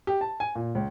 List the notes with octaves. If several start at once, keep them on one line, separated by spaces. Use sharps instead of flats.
G4
A5
G#5
A#2
C#2